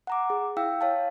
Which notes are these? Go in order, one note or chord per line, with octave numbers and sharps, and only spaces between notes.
F#5 A#5 D6
G#4
E4 F5 G5 E6
C#5 F5 A5